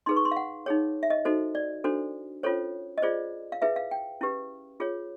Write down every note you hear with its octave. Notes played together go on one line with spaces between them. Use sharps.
D#4 G#4 B4 C6
C#6
C6
F5
F#5
D#4 G#4 C#5
E5
D#5
D#4 F#4 A4 C5
D5
D4 F#4 A4 C5
C#4 F4 A4 C5 C#5
D#5
F4 G#4 C5 D5
F5
E4 G#4 B4 E5
F5
G5
C#4 E4 G4 B4
F4 G#4 C#5